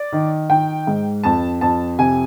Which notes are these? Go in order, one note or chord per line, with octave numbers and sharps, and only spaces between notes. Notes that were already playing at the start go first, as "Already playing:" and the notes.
Already playing: D5
D#3
D#3 G5
G#2
F2 A5
F2 A5
C3 G#5